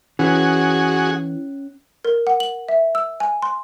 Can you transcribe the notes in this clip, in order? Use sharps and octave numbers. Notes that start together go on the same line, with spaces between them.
E3 C#4 F#4 G#4 F#6
A#4
F#5
F#7
E5
E6
G#5
C6